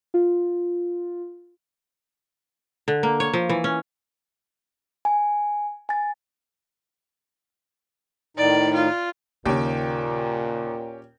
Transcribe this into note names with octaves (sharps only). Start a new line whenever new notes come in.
F4
D3
A#3
C#5
F3
E3
C#4
G#5
G#5 A6
A2 D#3 D#4 D5
F4
D#2 A#2 C#3 C#4 G4